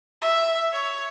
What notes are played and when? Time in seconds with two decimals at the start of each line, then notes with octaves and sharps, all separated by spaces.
0.21 E5
0.72 C#5